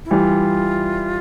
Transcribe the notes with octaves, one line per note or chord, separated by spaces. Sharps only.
E4
E3 G3 F4